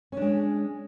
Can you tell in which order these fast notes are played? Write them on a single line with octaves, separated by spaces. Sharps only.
C#4 D4 G#3